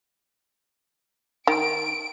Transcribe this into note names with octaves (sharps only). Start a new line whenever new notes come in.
D#3 D7